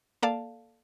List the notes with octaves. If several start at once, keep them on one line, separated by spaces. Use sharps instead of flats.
A#3 A4 D5 F5 A5